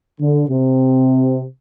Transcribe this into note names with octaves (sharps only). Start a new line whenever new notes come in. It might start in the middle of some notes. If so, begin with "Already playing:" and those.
D3
C3